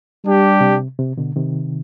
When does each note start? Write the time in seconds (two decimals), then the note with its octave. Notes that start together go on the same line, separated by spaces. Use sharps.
0.24 G3 D4 G4
0.61 C3
0.99 C3
1.17 B2 D3
1.36 C3 D#3